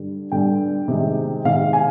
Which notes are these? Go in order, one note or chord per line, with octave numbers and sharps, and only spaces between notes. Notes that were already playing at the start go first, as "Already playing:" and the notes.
Already playing: G2 D3 G3
G2 D3 G3 G5
C3 D#3 G#3
C3 D#3 G#3 F5
G#5